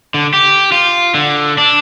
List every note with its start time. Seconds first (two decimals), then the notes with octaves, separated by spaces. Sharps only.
0.14 D3
0.34 G4
0.72 F4
1.14 D3
1.58 D4